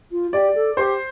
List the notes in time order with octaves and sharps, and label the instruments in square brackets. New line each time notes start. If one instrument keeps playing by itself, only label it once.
[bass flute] F4
[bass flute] G4 [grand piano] D5
[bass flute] A4
[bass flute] G4 [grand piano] C5